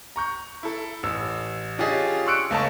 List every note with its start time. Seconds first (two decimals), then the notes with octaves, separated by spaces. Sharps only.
0.16 A#5 C#6 G6
0.63 E4 A4
1.03 A1 E6
1.78 C#4 D4 F4 G4 G#4 D#5
2.26 C6 C#6 E6 F#6 C#7 D7
2.51 C#2 A3 C#5 D#5 A5